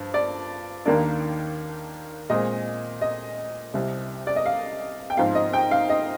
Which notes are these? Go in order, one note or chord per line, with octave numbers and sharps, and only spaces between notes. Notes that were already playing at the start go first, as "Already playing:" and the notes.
Already playing: G2 F3
D5
D#2 D#3 A#3 D4 D5
A#2 G#3 C4 D#5
D#5
C2 C3 G3
D5
D#5
F5
G5
G#2 F3 C4 F5
D#5
G5
F5
D#5